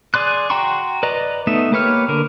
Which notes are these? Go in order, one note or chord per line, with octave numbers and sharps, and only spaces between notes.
G#4 D5 C6 F#6
F#4 G5 A#5 C6 C#6
B4 D5 D#5 A#5
A3 B3 D#4 E5
A#3 G4 B4 C#5 F6
D3 A#4